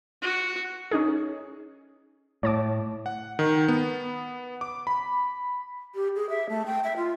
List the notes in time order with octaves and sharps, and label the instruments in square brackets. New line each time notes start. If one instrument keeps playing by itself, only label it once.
[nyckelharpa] F#4
[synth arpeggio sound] C#4 D#4 G#4
[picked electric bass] A2 [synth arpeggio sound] C#5 A5 D6
[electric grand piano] F#5
D#3
B3
D6
B5
[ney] G4
G#4
E5
A3
G5
E5
F4